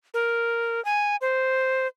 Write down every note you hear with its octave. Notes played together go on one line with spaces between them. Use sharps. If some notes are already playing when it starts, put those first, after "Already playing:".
A#4
G#5
C5